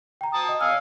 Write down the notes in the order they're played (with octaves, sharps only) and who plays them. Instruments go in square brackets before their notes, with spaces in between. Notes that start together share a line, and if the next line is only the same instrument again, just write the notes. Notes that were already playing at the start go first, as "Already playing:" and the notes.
[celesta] G5 A#5
[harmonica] A5 D#6
[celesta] D#5
[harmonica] F5 G#5 F6 [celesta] E6